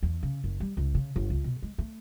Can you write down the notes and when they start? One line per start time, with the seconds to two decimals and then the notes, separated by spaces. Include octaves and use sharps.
0.03 E2
0.23 C#3
0.44 F#1
0.60 G3
0.77 C#2
0.95 C#3
1.16 G1
1.30 C#2
1.44 B2
1.62 G#3
1.78 A3